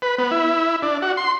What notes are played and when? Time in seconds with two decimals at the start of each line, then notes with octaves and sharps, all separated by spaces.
0.02 B4
0.18 B3
0.31 E4
0.82 D4
1.02 F#4
1.17 C6